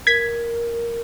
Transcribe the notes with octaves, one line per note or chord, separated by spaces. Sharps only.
A#4 G#6 B6